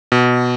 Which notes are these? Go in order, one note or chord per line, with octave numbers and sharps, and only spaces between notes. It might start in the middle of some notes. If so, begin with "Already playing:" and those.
B2